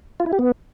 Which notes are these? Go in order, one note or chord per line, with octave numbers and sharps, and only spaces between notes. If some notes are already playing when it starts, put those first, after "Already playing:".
F4
E4
G4
B3